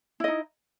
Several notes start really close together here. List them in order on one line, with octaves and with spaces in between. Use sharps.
E4 D#5 D#4